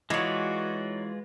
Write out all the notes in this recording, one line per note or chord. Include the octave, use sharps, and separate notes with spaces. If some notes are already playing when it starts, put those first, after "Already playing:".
E3 G#3 D#4 F4 F#4 C#5 D5